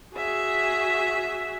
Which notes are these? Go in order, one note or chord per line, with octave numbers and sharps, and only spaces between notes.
F#4 G#4 E5